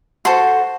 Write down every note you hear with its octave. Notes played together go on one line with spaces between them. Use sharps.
F#4 A4 C5 C6